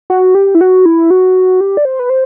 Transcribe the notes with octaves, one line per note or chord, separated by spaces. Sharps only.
F#4
G4
E4
F#4
E4
F#4
G4
D5
C5
B4
C5